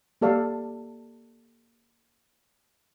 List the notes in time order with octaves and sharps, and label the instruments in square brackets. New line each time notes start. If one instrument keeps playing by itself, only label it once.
[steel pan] A#3 G4 A4 D5 F5